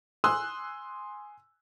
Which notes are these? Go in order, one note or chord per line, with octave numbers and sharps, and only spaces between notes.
G#5 C6 D#6 E6 F#6